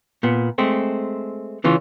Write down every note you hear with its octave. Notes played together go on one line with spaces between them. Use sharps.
A#2 B3
G#3 A3 C4
C#3 E3 C#4 F4